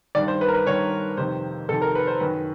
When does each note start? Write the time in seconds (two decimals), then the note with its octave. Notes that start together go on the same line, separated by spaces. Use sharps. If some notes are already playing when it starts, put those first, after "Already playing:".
0.15 G2 D#3 D5
0.28 C5
0.41 B4
0.48 A#4
0.54 B4
0.67 G2 D#3 C#5
1.17 F2 C3 D#3 C5
1.69 F2 C3 D#3 A4
1.82 A#4
1.95 B4
2.07 C5
2.20 F#2 D#3 B4